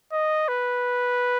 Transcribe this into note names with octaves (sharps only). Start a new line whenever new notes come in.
D#5
B4